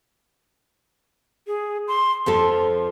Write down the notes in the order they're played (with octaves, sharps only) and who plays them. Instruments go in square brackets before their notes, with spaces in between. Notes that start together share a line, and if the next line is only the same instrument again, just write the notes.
[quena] G#4
C6
[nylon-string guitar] F2 F3 A4 [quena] C6